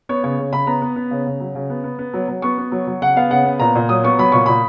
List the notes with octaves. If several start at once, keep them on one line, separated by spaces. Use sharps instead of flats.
B3 C#5
C#3 C#5
C#3
C#3 B5
B3 A#5
B3
B3
C#3
C#3
F#3
C#3
B3
B3
B3
F#3
F#3
B3 C#6
B3
F#3
F#3
C#3 F#5
B3 F5
C#3 F#5
B3
A#2 A#5
A#2
F#3 D#6
B3 C#6
F#3 B5
A#2 C#6
A#2 B5